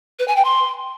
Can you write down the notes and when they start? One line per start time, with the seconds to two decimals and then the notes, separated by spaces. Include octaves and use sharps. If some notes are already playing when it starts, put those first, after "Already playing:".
0.19 B4
0.28 G#5
0.36 G5
0.45 C6